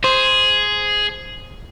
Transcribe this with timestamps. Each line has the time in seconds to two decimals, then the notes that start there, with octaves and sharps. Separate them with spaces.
0.04 G#4 C5